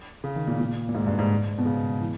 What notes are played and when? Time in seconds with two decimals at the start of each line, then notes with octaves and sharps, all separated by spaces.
0.24 C#3
0.36 D#3
0.47 A#2
0.59 A#2
0.89 A#2
0.95 G#2
1.07 G2
1.19 G#2
1.59 B2
1.66 C#3
2.01 E3